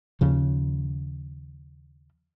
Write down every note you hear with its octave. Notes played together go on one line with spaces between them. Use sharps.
D#2 C#3 F3